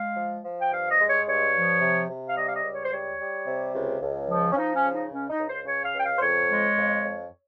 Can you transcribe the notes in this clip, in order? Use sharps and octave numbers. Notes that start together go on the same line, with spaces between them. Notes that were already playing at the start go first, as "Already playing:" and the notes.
Already playing: G#3 F5
F3
F3
G5
G2 F5
D#5
G#3
C#5
G2 C#5
F3
C3
C3
F5
G3 D#5
F5
D#5
C#2
C#5
C5
G3 C#5
G3
C3
C#2
C#2
F3
C#4
F3 D#4
C#4
C#3
D#4
C#2 C#4
D#4
C#2
C5
C#3 C#5
F5
C#2 G5
F5
C5
F2 C#5
G#3
F2
F2